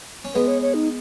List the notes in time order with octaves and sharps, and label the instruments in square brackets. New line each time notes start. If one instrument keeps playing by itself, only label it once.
[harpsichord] C#4
[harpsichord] G#3 B3 [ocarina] B4
[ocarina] C#5
C#5
D#4